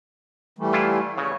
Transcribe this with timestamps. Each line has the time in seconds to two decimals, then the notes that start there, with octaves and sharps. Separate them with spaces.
0.59 E3 G3 A3
0.73 E4 F4
1.18 C#3 C#5